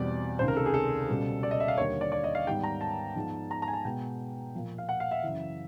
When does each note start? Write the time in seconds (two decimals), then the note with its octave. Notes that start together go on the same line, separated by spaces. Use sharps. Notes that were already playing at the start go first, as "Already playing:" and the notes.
Already playing: E2 B2 G3 C4 D5
0.39 C#2 C3 D#3 C5
0.48 A#4
0.57 A4
0.66 G#4
0.74 A4
1.08 C#2 B2 G3
1.43 D5
1.51 D#5
1.60 E5
1.68 F5
1.77 D#2 D3 G3 A#3 C#5
2.01 D5
2.12 D5
2.24 D#5
2.35 F5
2.47 G#2 D#3 G3 B3 G5
2.63 A#5
2.81 A5
3.16 G#2 F3 G#3 B3
3.51 A#5
3.62 A#5
3.68 G#5
3.73 A5
3.85 B2 G#3 B3 G5
4.55 A#2 F3 A#3
4.78 F5
4.89 F#5
5.00 F5
5.11 E5
5.23 F#2 C#3 E3